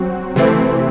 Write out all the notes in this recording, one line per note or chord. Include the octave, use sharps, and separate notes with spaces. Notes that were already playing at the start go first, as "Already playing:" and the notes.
Already playing: F#3 C4 F#4
C3 E3 A3 C4 E4